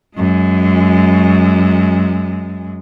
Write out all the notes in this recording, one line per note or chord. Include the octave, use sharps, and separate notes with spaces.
F#2 G#3